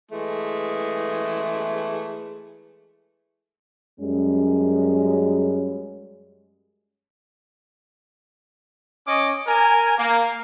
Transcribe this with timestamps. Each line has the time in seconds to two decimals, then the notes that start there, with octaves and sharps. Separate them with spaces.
0.11 E3 G#3 A3
3.99 F#2 G3 G#3 C#4
9.08 C#4 D#5 D6
9.47 A#4 G#5
9.98 A#3